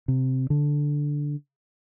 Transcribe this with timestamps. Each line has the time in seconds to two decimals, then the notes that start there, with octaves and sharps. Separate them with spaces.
0.08 C3
0.50 D3